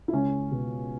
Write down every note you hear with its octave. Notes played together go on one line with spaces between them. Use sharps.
E4
C#2 C#4
B2